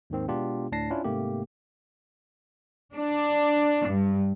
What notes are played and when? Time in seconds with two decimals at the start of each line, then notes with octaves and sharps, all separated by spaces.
0.10 D#2 G#2 D#3 C4
0.28 B2 G#3 B3 D4 F4 G4
0.72 D2 A2 D4 A5 A#6 C7
0.90 C#4 D4 E4 F4
1.04 G#2 C3 A3 A#3 G4
2.94 D4
3.87 G2